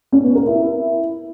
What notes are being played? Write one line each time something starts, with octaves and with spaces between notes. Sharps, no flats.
C#4
B3
A#4
E4